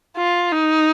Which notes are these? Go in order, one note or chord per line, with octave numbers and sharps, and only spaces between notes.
F4
D#4